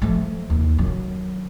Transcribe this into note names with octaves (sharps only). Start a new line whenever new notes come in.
F3 A3
D#2
D#3 F#3